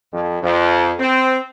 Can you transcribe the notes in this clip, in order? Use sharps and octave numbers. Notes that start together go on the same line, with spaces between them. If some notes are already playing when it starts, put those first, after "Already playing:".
F2
F2
C4